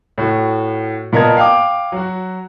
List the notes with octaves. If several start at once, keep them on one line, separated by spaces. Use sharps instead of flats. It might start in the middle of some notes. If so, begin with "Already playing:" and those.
A2 F#4
A#2 B3 A#4 D#5 A5 G#6
F5 G5 D6
F#3 F#4